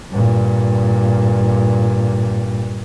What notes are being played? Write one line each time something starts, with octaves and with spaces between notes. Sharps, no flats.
G2 A#2